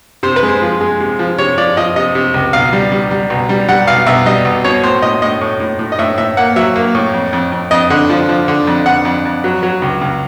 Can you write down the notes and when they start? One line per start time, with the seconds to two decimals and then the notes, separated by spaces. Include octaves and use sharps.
0.23 C3 C5
0.36 B4
0.43 G#3
0.48 C5
0.62 F3
0.81 G#3
1.00 C3
1.19 F3
1.38 C3 C#5
1.58 F3 D5
1.77 F3 D#5
1.96 C3 D#5
2.15 C3
2.34 C#2
2.53 B1 F5
2.73 G3
2.92 G3
3.11 G3
3.30 B1
3.49 G3
3.68 G3 F#5
3.87 B1 F5
4.07 B1 E5
4.26 G3 D#5
4.45 B1
4.64 B2 C#5
4.83 A2 C5
5.02 A2 D#5
5.22 A2 D#5
5.41 A2
5.60 A2
5.79 A2
5.92 D#5
5.99 A2 E5
6.18 A2 E5
6.37 A#3 F#5
6.56 F#3 E5
6.76 A#3
6.95 A2
7.14 F2
7.33 F2
7.52 F2
7.71 F2 D#5
7.90 D3
8.10 F3
8.29 F3
8.48 D3
8.67 F2
8.86 D3 F#5
9.05 F2
9.25 F2
9.44 F#3
9.63 F#3
9.82 C#2
10.01 C#2